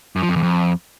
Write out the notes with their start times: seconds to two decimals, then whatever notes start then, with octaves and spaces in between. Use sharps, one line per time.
0.16 F#2
0.22 F3
0.29 F2
0.36 E2
0.43 F2